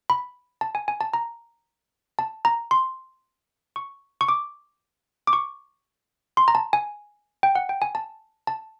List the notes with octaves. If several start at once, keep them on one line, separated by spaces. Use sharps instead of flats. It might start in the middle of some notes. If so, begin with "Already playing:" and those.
B5
A5
G#5
G#5
A5
A#5
A5
A#5
C6
C#6
C#6
D6
D6
C#6
C6
A#5
A5
G#5
G5
F#5
G5
G#5
A5
A5